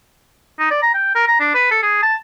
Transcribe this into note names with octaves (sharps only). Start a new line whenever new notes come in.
D#4
D5
A#5
G5
A#4
A#5
D4
B4
A4
G#4
A5